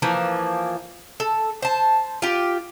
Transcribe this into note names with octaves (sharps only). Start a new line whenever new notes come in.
E3 F3 A#3
A4
C5 A5
F4 G4